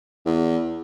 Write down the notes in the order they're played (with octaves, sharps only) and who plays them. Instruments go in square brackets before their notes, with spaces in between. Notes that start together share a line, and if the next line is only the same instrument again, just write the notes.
[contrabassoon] E2